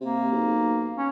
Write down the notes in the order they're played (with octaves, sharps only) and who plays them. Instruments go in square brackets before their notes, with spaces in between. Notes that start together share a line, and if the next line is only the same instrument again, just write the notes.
[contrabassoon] C3 [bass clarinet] A#3
[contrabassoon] B1
[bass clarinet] C#4